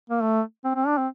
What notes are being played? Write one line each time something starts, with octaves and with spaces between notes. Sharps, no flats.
A#3
A3
C4
C4
D4
C4